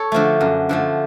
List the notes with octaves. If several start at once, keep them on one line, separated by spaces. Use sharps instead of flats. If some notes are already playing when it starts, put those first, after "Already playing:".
Already playing: A4 C#5
D3 F3 A3
F#2
D3 F3 A3